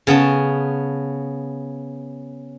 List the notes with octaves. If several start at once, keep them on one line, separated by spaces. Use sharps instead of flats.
C#3 B3 C#4 A5